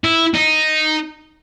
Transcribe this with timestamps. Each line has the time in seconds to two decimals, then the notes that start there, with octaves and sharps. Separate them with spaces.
0.04 E4
0.34 D#4